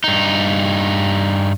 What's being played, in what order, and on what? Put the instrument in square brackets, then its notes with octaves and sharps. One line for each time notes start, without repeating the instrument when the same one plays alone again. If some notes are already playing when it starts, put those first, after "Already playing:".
[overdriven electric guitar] G2 D#4